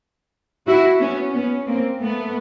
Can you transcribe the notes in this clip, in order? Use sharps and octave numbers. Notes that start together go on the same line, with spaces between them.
E4 F#4
B3 C#4
B3 C#4
A#3 C4
A3 B3